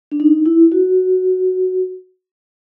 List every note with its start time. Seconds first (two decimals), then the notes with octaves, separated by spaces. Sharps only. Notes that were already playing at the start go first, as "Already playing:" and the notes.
0.11 D4
0.20 D#4
0.46 E4
0.72 F#4